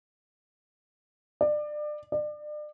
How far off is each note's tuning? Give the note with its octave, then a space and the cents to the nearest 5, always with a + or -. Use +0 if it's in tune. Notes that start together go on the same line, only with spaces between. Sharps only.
D5 +30
D5 +35